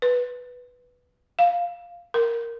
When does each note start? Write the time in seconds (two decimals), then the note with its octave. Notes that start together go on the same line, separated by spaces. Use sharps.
0.02 B4
1.39 F5
2.14 A#4